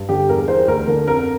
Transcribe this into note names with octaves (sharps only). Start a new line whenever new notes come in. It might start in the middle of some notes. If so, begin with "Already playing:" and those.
Already playing: G2
D3 G4
E2 A#4
E3 C5
D2 A#4
D3 A#4
F2 A#4